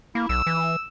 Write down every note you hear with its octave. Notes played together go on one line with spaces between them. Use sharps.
A#3 E4
B1 E6
E3